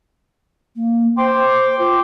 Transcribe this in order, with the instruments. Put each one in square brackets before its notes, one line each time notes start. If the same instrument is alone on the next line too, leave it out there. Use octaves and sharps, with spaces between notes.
[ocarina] A#3
[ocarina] C5 [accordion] G5 C6 D6
[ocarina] F4